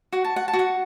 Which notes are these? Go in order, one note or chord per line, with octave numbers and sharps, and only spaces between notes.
F#4 F#5
A5
F#5
A5
F#4
F#5